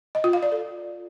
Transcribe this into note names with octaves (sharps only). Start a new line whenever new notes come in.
D#5
F4
F5
D5
A4